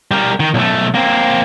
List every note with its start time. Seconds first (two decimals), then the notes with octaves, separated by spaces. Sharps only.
0.11 G3 A#4
0.40 D#3
0.54 B1 A3
0.95 A#3 C4